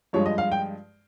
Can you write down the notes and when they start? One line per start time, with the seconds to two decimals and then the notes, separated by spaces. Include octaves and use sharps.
0.13 G2 F3 G#3 C#5
0.26 D#5
0.38 F5
0.52 G5